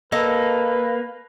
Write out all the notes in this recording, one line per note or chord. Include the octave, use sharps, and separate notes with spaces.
A#3 A4 B4 D#5